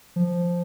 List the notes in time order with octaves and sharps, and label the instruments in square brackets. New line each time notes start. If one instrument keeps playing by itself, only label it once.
[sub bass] F3